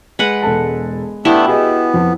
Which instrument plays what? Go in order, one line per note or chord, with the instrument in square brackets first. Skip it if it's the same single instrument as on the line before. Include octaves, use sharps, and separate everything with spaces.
[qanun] G#3 B4 F#5
[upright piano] E1 A4 A5
[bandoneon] A3 B3 D4 [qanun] E4 G4 [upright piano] E7
[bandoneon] B3 [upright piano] F#4 G#4 D#5
[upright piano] F2